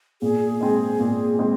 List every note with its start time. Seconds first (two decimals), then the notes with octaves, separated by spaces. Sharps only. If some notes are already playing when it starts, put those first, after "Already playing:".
0.22 A#2 G#4
0.61 G#3 C4
1.00 A#2
1.39 G#3 C4